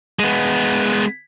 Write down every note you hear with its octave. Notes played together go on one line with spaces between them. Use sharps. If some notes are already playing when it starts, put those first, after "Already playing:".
G#3 B3